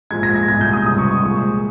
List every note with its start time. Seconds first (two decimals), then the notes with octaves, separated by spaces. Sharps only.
0.11 A#2 F3 G#3 G#6
0.23 A#6
0.36 G#6
0.48 C2 A#2 G#3 G#6
0.61 G6
0.73 D#6
0.86 C#2 C3 G3 D#6
0.98 C#6
1.11 C#6
1.24 A#2 F3 G#3